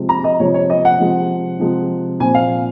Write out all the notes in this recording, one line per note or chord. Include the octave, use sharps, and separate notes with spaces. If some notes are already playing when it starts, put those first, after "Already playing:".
Already playing: C3 F3 G#3
A#5
D#5
C3 F3 G#3 C#5
C#5
D#5
F#5
C3 F3 G#3
C3 F3 G#3
A#2 F3 C4 G#5
F5